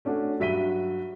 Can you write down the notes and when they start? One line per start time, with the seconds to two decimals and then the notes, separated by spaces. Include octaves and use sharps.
0.05 A3 C#4 D4 F#4
0.40 G2 F#3 E5 B6 D#7 G7